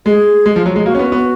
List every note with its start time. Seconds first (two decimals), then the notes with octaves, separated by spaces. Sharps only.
0.06 G#3 G#4
0.46 G#3
0.56 F3
0.66 F#3
0.76 G#3
0.86 A#3 F#4
0.95 C#4
0.99 B3
1.12 B3